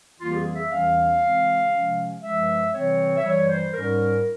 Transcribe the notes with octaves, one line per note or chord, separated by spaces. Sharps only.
F2 E3 G3 A#3 F4
G4
G#4
E5
E2 E3 G3 C#4 F5
C#3 E3 G#3 C4
C3 F3 G#3 C#4
G2 F3 G#3 E5
C3 E3 G3 C4 C#5
E5
G2 E3 G3 C#5
C5
G#2 G3 C#4 A#4